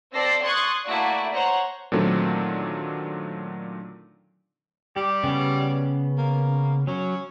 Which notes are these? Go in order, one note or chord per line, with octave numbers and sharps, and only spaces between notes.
C4 A4 D5 E6 A#6 C7
C6 C#6 D#6 F#6 G#6 A6
A3 A#3 E4 F#4 D5
C5 C#5 F#5 A#5
A#2 D3 D#3 F#3 A3 C4
G3 G4
C#3 B3 C#4
A#3
F#3 C#4